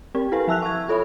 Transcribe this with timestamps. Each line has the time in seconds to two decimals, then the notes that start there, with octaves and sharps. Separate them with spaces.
0.15 C4 G4 A#4 G5
0.32 E4 A4 B4 F5 G#5
0.47 F3 E5 A5 E6 F#6 F7
0.62 C#6 G#6
0.88 F4 A4 C#5 E5 B5